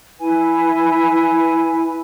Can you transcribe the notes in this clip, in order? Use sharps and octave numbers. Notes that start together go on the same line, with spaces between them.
E4 B4 G#5